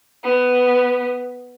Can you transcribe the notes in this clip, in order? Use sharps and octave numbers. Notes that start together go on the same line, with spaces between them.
B3